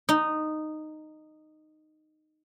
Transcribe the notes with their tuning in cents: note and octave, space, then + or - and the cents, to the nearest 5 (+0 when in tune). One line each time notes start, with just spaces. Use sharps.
D#4 -10